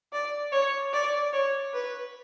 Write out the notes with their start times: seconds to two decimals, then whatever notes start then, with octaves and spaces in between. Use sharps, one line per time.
0.13 D5
0.52 C#5
0.93 D5
1.33 C#5
1.73 B4